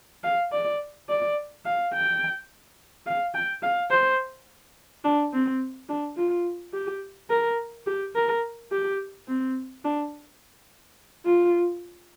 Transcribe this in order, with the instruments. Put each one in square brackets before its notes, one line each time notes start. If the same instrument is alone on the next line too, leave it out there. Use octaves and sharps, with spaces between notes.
[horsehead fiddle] F5
D5
D5
F5
G5
F5
G5
F5
C5
D4
C4
D4
F4
G4
A#4
G4
A#4
G4
C4
D4
F4